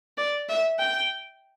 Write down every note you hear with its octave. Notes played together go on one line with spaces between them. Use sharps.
D5
E5
G5